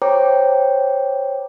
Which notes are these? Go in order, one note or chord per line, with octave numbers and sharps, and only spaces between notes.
C5 C#5 G5 A#5 D6